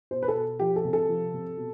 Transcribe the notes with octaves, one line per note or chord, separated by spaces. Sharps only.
B2 C5
B4
A4
B2
F3 G4
A4
C3
A4
F3
C3
B2